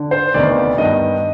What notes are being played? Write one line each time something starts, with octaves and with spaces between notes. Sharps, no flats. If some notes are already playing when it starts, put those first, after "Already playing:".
Already playing: D3
C5
D2 C3 D#3 B3 D5
G2 D#3 B3 D#5